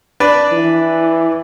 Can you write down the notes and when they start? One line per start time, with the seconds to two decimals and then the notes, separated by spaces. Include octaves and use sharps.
0.20 D4 B4 D5
0.52 E3